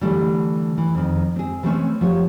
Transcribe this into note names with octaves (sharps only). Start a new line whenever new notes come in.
D3 E3 G3 A3 D4
E3
F2 D#3
C4 G#4
E3 G3 A3 A#3 C4 C#4
F3 G4 C#5